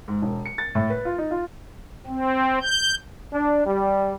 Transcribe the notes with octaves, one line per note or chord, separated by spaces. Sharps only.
G#2
E1
C#7
A6
A2
B4
F4
D#4
F4
C4
G6
D4
G3